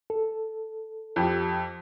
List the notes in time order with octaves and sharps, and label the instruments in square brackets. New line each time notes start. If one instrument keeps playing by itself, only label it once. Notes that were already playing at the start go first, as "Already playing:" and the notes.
[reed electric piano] A4
[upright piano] F2 G4